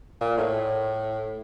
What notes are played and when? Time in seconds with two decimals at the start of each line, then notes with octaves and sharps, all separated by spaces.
0.21 A#2
0.38 A2